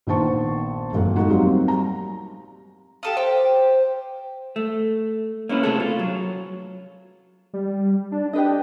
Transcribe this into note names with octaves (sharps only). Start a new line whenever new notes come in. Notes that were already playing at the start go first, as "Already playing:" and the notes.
A#1 D#3 B3 C5 A5 C#6
G1 F2 A#2 F#3 A3 F#5
G#3 D#4 F#4
F#3 G3 A#3 C4 D#4 G4
G3 A#5
G4 A4 F5 D#6
G4 C5
A3
A#3 C#4 E4 B4
C3 A3 G#4 A4
F4
F#3
G3
D4
D4 G4 B4 D#5